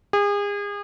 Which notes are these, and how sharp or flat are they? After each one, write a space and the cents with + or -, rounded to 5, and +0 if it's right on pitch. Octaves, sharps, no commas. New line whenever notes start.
G#4 -35